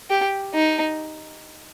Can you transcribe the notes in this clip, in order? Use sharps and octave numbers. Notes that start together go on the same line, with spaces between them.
G4
D#4